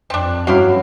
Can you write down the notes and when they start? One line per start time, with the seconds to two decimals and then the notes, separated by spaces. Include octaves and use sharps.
0.10 F2 C4 D4
0.47 G2 F#3 C#4 E4 F#4 G4 F5